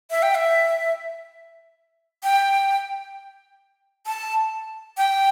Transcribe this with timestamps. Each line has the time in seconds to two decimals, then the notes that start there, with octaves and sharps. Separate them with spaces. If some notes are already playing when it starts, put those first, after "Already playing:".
0.11 E5
0.23 G5
0.35 E5
2.23 G5
4.07 A5
4.97 G5